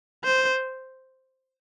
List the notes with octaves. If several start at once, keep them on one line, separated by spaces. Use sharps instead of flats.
C5